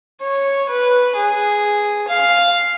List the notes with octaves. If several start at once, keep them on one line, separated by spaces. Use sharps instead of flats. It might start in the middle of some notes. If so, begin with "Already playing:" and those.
C#5
B4
G#4
F5